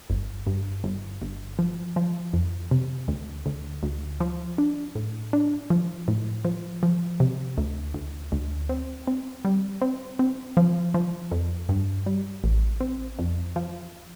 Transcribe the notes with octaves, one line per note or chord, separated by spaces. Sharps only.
G1
G2
G1
G1
F3
F3
F2
C3
D2
D2
D2
F3
D4
A2
D4
F3
A2
F3
F3
C3
D2
D2
D2
C4
C4
G3
C4
C4
F3
F3
F2
G2
G3
A1
C4
F2
F3